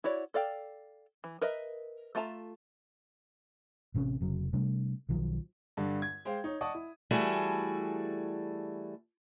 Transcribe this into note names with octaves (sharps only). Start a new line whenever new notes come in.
E4 F#4 C#5 D5
A4 D5 F5 G5
E3
A#4 B4 D#5 E5
A3 F4 E5 A5 A#5
A1 C3 C4 C#4
F1 C#3 F#3
C3 G3 A3 D4
B1 D#3 F3 F#3
G2 D3
G#6
G#3 C5 F5 G5
D#4 C#5
D5 D#5 F#5 A5 C#6 D#6
E4
E3 G3 A3 F#4 G#4 A4